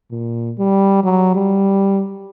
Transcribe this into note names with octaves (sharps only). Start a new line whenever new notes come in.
A#2
G3
F#3
G3